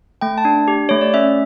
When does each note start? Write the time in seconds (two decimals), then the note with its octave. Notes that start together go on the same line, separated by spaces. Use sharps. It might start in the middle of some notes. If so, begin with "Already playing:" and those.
0.21 A3 G5
0.38 A5
0.45 D4
0.68 G4
0.89 A3 C#5
1.01 D5
1.14 C#4 E5